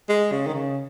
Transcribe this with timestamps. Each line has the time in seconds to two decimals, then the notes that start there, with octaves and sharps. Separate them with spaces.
0.09 G#3
0.32 C#3
0.47 D#3
0.54 C#3